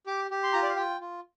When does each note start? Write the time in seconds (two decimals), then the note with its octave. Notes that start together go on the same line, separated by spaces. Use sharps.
0.06 G4 D6
0.31 G4
0.43 C6
0.53 F4 A#5
0.63 D5
0.69 F5
0.76 F4 G5
1.01 F4